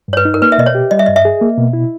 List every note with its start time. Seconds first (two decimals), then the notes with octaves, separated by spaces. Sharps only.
0.08 G2 C#5
0.17 B4
0.25 D#4
0.34 A#4
0.42 A#3 B4
0.52 E5
0.58 B2 D#5
0.66 C#5
0.75 G4
0.91 G3 D#5
0.99 E5
1.06 G2 D#5
1.16 E5
1.25 G#4
1.41 A#3
1.58 B2
1.73 E4